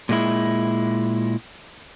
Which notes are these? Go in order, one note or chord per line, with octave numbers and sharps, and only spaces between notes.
A#2 G#3 E4